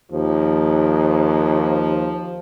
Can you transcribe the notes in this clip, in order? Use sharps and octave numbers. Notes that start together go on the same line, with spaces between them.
D#2 F3